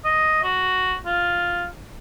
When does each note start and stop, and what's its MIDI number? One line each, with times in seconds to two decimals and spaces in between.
0.04 0.40 75
0.43 0.96 66
1.06 1.65 65